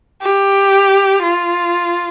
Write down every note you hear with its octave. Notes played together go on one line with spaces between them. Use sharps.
G4
F4